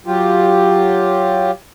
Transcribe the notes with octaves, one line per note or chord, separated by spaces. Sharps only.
F#3 F4 G4